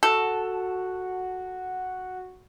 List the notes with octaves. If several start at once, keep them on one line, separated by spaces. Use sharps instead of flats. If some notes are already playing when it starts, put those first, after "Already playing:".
F#4 A4